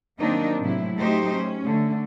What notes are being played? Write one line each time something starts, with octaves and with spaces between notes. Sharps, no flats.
D#3 F#3 A#3 C4 D4 D#4
A2 C3 F#3 E4
F#3 A3 C#4 D#4 G4 C5
C#4
D3 A3